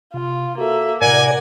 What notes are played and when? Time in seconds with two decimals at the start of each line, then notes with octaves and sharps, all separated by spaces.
0.14 C3 F4 F5
0.58 A#3 F#4 A4 E5
1.01 A2 C3 A#4 D5 F#5 G#5